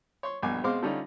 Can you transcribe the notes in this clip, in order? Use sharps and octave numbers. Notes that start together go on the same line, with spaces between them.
C#5 C6
A#1 G2 B2 G#5 D6
B2 G#3 C4 C5 F5 D6
D3 G3 C#4 D#4 F4